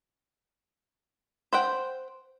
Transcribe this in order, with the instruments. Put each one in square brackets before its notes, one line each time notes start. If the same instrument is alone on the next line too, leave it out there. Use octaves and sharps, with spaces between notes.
[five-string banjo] C5 F#5 G5